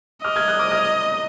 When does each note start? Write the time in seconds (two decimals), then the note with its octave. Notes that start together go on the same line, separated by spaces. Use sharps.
0.24 D#5 D6 F6
0.36 F6 G#6
0.48 D#6 F#6
0.59 D6 F6
0.71 F6 G#6